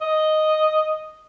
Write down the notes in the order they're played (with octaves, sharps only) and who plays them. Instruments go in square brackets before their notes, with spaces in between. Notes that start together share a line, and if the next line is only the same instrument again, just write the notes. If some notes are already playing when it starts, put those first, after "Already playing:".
[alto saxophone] D#5